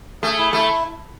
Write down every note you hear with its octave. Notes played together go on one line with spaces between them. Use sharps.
A3 G#4
E4
A3 E4